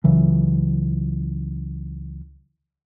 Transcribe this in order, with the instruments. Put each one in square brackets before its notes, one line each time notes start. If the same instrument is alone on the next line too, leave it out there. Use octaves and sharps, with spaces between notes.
[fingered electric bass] C#2 C#3 E3 F#3